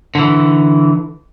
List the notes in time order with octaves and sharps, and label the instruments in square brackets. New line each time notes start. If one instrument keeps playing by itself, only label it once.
[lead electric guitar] D3 E3